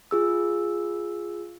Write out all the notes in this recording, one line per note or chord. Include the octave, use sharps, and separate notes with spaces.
F4 G#4 E6